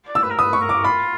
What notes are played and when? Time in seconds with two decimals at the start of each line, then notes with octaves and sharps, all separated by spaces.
0.08 D5
0.15 E6
0.23 B4
0.30 A#4
0.38 B4 D#6
0.53 C#6
0.62 A#4
0.69 D6
0.84 F4 B5